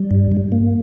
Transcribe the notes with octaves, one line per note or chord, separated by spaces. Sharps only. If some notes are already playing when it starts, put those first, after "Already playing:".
Already playing: G3
G2
G2
A#3